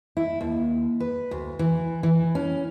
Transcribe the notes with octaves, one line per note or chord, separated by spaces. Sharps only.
E4
D#2
B4
D2
E3
E3
C#4